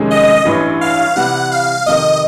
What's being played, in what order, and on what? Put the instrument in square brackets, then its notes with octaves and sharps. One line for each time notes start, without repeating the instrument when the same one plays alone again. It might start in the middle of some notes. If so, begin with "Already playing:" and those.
Already playing: [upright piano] F2 C3 D#3 G#3 C#4
[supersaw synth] D#5
[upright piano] A1 G2 E3
[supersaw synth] F5
[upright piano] C3 E3 G3 [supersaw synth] F#5
[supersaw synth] F5
[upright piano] F2 C3 D#3 [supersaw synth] D#5